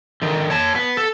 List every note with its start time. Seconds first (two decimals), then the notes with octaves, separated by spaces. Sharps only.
0.22 D3 D#3
0.50 C#5 A5
0.75 B3
0.97 A4